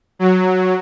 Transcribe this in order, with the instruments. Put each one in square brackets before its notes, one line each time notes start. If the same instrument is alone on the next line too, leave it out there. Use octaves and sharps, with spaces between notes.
[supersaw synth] F#3